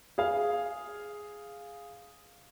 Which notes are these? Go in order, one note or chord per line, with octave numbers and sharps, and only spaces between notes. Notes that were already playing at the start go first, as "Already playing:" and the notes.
G#4 F5